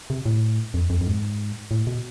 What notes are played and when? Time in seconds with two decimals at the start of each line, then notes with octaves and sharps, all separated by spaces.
0.10 C3
0.26 A2
0.74 F2
0.90 F2
1.01 F2
1.07 G#2
1.71 A2
1.87 B2